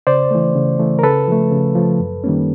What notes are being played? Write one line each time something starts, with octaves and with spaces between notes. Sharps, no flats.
C#3 C5 D5
E3 A3
C#3
E3 A3
A#4
C#3 A4 B4
F3 A3
C#3
F3 A3
F#2
D#3 G3 A#3 C#4